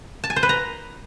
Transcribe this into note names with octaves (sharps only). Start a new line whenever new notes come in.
A5
G#5
C5
B4
A#5